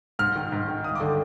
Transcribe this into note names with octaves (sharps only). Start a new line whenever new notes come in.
G#2 F6
D#3
G#2
D#3
G2 D#6
D6
D3 G5